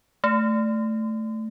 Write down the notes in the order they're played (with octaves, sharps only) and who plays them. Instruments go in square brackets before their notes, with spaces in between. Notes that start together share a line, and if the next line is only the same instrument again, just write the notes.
[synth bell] A3